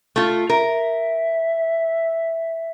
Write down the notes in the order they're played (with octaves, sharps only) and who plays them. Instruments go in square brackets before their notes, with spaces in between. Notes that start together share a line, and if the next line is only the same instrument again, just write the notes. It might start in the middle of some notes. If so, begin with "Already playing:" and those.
[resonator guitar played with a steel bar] A3 F4
[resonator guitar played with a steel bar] A#4 [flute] E5